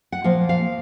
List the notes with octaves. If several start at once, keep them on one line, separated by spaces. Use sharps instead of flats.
F#5
A#2 F3 A#3 F5
F5